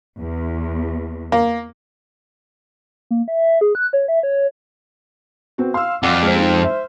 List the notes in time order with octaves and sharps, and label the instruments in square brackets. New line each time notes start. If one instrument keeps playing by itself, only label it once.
[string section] E2
[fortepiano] A#3
[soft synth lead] A#3
E5
G#4
F#6
C#5
E5
C#5
[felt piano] B3 C4 F#4
[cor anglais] F5 [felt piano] C6 E6
[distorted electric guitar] F2 [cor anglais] D5 [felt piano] F#5 E6 F6
[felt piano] G#3 C5
[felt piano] G#3 D#4 [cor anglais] C5
[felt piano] E5